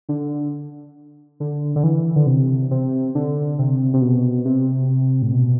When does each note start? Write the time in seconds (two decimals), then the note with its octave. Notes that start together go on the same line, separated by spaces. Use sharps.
0.09 D3
1.40 D3
1.76 D3
1.83 E3
2.16 D3
2.27 C3
2.71 C3
3.15 D3
3.59 C3
3.94 C3
4.02 B2
4.45 C3
5.22 A2
5.33 B2